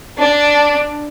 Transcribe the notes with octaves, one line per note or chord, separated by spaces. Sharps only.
D4